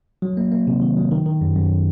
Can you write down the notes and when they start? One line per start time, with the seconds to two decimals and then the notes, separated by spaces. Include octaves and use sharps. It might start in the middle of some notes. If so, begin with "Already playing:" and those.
0.22 F#3
0.37 A#3
0.52 A#3
0.67 C3
0.82 D#3
0.97 F#3
1.11 D#3
1.26 D#3
1.41 F#2
1.56 F#2